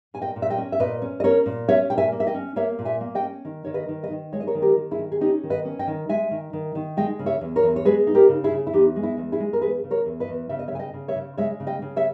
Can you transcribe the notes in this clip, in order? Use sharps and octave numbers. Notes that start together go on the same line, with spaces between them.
A#2 G#5
D#5 G5
A#2
E5
D#5 G5
C#4
E5
A#2 B4 D#5
C#4
D#5
C#4 A#4 C#5
A#2
C#4 C#5 E5
A#2 G5
E5 G#5
A#3
E5
D#5 G5
C#4
A#3 C#5 E5
A#2
E5 G#5
A#3
D#5 G5
C#4
D#3
D#3 C#5
B4 D#5
D#3
B4 D#5
D#3
G#3 C#5
D#5
A#4 C#5
D#3
G4 A#4
D#3
E4 G#4
D#3
G#4
C#4 D#4 G4
D#3
B4 D#5
C#4
D#5 G5
D#3
G#3 E5 G#5
D#3
D#3
D#3
G#3 D#5 G5
C#3
C#5 E5
E2
A#4 C#5
E2
C#5
G#3 G#4 B4
D#4
G4 A#4
C#3
E4 G#4
C#3
E4
E2 D#4 G4
G#3
E4
E2
E4 G#4
G#3
A#4
E2 G#4 B4
C#3
A#4 C#5
E2
B4 D#5
E2
C#3 E5
D#5
C#5 E5
C#3 G#5
D#5 G5
C#3
C#5 E5
C#3
G#3 C#5 E5
C#3
D#5 G5
C#3
C#5 E5